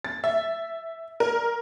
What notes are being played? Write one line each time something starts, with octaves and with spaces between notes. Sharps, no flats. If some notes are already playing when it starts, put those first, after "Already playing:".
A6
E5
A#4